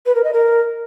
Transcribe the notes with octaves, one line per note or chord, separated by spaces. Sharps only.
B4
A#4
D#5
A#4